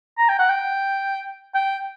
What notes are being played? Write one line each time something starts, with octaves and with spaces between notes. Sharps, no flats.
A#5
G5
F#5
G5
G5